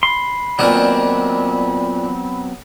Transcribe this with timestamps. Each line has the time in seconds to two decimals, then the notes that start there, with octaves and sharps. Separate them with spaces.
0.03 B5 C6
0.59 A#2 D#3 F#3 B3 C4 D4